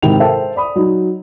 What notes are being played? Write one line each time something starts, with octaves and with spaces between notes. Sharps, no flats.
G#2 C3 D#3 E4 G5 F7
A4 A#4 C5 E5 G5 A5
D5 B5 D#6
F#3 D#4